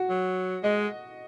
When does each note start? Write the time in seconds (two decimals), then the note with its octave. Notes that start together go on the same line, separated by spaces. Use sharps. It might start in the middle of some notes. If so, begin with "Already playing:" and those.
Already playing: F#4
0.09 F#3
0.63 G#3 D#5